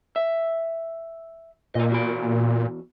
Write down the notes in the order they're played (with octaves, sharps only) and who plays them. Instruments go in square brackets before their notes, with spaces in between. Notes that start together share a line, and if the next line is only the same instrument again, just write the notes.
[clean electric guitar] E5
[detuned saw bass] A#2 [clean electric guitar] F4 D#5
[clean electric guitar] E2 F#4 B5